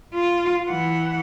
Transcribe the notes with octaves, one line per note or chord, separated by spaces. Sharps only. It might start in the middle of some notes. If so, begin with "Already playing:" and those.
F4
E3 F#5